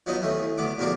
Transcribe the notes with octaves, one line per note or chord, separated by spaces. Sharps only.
F3 F#3 B3 D#4 D#5
D#2 E3 A3
D2 B3 D6
E2 B2 F3 A#4 D5 D6